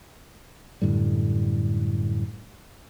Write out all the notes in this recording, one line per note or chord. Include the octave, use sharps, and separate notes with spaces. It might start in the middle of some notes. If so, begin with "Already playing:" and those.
F#2 A2 D3 G3